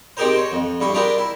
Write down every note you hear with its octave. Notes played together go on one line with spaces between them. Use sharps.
C4 D#4 G4 G#4 A#4 C5
C5 C#5
F2
G2 E4 C#6
D4 F4 G4 G#4 A#4 B4
E4